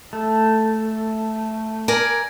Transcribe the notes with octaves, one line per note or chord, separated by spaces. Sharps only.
A3
A#4 D5 G#5